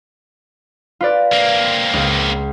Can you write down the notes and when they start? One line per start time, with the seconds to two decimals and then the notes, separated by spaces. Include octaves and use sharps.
1.01 F4 B4 D5
1.33 A#3 C4
1.94 C#2